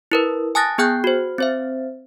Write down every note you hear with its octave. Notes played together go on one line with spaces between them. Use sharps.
E4 A#4 B4
G#5 A5 D#6 F#6 A6 A#6
B3 G#4 G5 F#6 G6
F#4 C5
C4 C5 E5